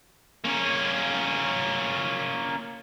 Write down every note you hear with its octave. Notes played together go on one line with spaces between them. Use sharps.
A#3 C#4